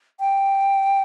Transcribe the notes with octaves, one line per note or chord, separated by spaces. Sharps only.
G5